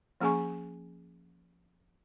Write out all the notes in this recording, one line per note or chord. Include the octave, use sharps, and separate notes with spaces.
F3 A#3 C#4 G#4 G#5 C#6